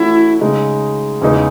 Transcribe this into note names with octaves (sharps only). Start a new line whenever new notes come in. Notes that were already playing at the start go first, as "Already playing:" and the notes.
Already playing: E3 A3 C#4 E4 F#4
C#3 G#3 D#4
E2 C#3 E3 G#3 D#4